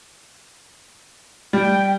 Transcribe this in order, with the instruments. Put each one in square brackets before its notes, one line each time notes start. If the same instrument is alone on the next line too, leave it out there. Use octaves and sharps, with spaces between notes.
[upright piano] G3 [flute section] G5